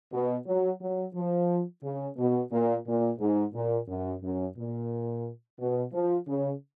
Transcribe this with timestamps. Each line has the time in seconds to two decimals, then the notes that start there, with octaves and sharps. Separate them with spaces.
0.12 B2
0.46 F#3
0.80 F#3
1.14 F3
1.83 C#3
2.16 B2
2.51 A#2
2.86 A#2
3.19 G#2
3.54 A#2
3.88 F#2
4.22 F#2
4.57 A#2
5.59 B2
5.92 F3
6.26 C#3